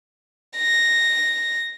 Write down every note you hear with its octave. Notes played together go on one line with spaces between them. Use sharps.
A#6